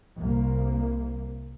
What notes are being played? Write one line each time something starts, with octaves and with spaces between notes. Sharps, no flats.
C2 A#3